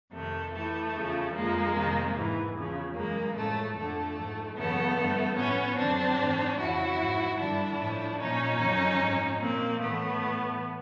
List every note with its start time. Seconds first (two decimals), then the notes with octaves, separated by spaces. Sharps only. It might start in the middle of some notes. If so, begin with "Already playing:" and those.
0.13 F2 C3 D#3 A3
0.53 A2 E3 A3
0.94 E2 C#3 F3
1.34 F2 D3 F3 G#3 A#3
1.74 F2 C3 D#3
2.15 G#2 E3
2.55 E2 C#3 F3
2.95 F#2 C#3 E3 G#3 A#3
3.35 A2 F3 A3
3.76 F2 D3 F3 A3
4.16 G#2 F3
4.56 F#2 C#3 E3 A3 B3
4.97 G2 D3 F3
5.37 A2 F3 B3 C#4
5.77 F#2 D3 F3 C4 D4
6.18 G#2 E3
6.58 F2 C#3 E3 E4 F#4
6.98 G#2 F3
7.39 G2 D3 F3 D4 E4
7.79 A2 F3
8.19 A#2 F3 C#4 D#4
8.60 F#2 D3 F3
9.00 G#2 F3
9.40 A#2 F3 A#3 C4
9.81 A2 E3 A3 B3
10.21 A2 E3